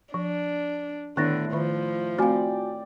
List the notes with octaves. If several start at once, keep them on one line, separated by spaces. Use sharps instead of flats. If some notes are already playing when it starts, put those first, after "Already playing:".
F3 D4
A2 D3 D#3 B3 D4 F#6 A6 A#6
D#3 F3 E5 B5
A3 C4 F4 F#4 D5 F5 G5 G#5